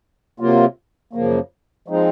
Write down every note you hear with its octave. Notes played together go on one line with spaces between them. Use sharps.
C3 F#3 A#3 F4
F#2 C#3 F3 A#3
F3 G#3 C4 D#4